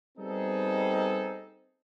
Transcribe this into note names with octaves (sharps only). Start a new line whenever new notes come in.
G3 B3 C4 D#4 G#4 A4